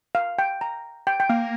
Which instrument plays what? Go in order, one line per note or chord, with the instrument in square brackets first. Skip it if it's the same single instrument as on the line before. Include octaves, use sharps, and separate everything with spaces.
[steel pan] F5
G5
A#5
G5
G5
[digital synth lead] A#3 [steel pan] F5